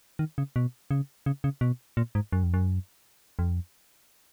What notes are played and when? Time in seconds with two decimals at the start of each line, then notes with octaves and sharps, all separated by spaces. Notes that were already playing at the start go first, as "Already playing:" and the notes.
0.19 D#3
0.38 C#3
0.56 B2
0.91 C#3
1.26 C#3
1.44 C#3
1.61 B2
1.97 A#2
2.15 G#2
2.33 F#2
2.43 F2
2.54 F#2
3.39 F2